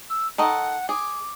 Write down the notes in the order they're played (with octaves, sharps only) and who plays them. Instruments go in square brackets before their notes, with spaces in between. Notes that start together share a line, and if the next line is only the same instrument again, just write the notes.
[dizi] E6
[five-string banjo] D#3 A4 D#5 [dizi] F#5
[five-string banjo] G#4 [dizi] D6